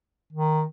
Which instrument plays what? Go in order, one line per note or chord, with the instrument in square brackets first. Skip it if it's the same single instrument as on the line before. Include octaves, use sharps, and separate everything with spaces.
[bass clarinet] D#3